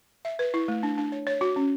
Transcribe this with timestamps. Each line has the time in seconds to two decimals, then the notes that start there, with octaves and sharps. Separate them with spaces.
0.25 E5
0.39 B4
0.54 E4
0.68 A3
0.83 D4
0.98 D4
1.12 C#5
1.27 C#5
1.41 F#4
1.56 C#4